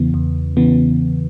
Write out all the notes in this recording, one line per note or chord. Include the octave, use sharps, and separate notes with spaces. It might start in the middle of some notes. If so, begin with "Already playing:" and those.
Already playing: E2 C#3 E3 B3
E2
C#3 E3 B3